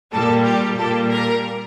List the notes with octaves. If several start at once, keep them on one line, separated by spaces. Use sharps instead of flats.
A#2 G3 A4
G4
A#2 G3 A4
A#4